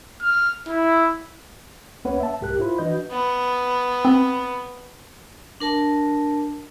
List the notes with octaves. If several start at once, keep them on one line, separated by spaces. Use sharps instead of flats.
F6
E4
C#2 A#3 C#4 B4 C#5 F#5
E5 A5
C2 G#2 G4 A#4 F#6
E4 F4 C5 B5
E3 D4 F#4 B4 D#5 G6
B3
C4
D4 A#4 A5